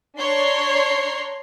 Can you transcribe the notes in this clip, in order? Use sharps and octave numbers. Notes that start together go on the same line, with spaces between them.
D4 C#5 A#5 C6